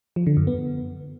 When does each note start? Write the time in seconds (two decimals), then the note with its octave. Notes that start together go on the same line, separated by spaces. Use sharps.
0.16 F3
0.27 D3
0.37 F#2
0.47 B3